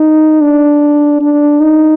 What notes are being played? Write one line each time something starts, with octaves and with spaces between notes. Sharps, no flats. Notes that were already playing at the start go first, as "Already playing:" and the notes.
Already playing: D#4
D4
D4
D#4